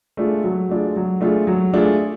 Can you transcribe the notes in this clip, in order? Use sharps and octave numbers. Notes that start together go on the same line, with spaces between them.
A3 D4 F4 G#4
F#3
A3 D4 F4 G#4
F#3
A3 D4 F4 G#4
F#3
A3 D4 F4 G#4